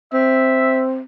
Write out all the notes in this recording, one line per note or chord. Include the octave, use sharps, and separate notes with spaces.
C4 E5